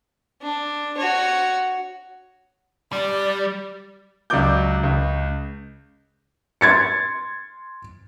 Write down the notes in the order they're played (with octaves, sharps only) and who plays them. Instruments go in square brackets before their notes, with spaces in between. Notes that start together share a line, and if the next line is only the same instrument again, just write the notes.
[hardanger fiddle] D4
F#4 C#5
[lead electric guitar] G3 [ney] D5
[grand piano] C#2 F#3 D5 D6 G6
C#2
[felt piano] C6 G#6 A6 C#7